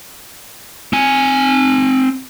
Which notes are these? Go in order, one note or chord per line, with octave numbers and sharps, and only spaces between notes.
C4 G#5